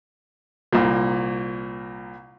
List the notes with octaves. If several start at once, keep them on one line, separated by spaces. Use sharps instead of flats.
C2 A#2